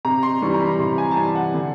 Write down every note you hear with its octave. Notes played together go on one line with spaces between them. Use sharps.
C3 A#5
C6
E3 G3 C#6
A#5
B5
C3 C6
G#5
A5
E3 G3 G#5
F#5
D3